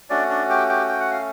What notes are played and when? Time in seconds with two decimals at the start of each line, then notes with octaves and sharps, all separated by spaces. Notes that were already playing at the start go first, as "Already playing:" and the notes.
0.10 A3 C#4 D4 F#4 D5
0.30 D4 D5
0.50 G4 G5
0.69 G4 G5
0.88 G5
1.00 F#5
1.11 F5